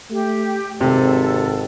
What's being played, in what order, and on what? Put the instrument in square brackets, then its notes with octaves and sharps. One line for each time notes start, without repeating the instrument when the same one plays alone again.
[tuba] A3 [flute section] G4
[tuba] G#1 [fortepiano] C3 [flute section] A4